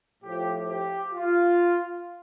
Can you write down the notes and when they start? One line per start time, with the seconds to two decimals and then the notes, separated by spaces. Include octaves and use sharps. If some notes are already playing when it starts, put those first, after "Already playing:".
0.23 A2 F3 G4
0.69 G4
1.14 F4